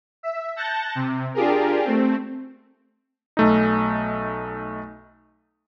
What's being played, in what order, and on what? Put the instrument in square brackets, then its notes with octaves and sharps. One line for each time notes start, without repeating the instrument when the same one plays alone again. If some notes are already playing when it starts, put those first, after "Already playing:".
[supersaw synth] E5
A5 F#6 G6 A6 A#6 C#7
C3
D4 F4 G4 G#4 A#4
A3 C4
[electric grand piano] B1 A3 D#4